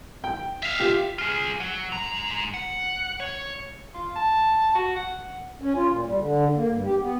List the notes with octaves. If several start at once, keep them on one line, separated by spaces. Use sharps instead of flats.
G5
E5 F5
F4 G4
F4 G#4
F#3
G#2 A#5
F#5
C#5
F4
A5
F#4
F#5
C#4
F4
A#2
G3
D3
A#3
G2
G4
B3